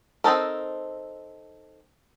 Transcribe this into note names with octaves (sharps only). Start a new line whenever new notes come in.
C4 C#4 D#4 A4 A#4